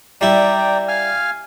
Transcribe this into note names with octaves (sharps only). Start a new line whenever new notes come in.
G3 E4 D5 G5 A#5
F5 G#5 F6